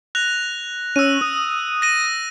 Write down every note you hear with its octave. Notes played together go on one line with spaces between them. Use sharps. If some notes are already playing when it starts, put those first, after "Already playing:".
F#6 A#6 F7
C#4 E6 D#7
D#6
A#6 D#7